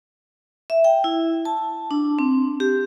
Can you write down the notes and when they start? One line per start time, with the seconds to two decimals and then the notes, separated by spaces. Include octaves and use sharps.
0.70 E5
0.84 G5
1.04 E4
1.45 A5
1.91 D4
2.19 C4
2.60 G4